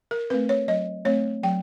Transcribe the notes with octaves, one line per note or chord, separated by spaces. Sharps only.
A#4
A3 C4 B4
C#5
F#3 D#5
A3 C4 C#5
F#3 G5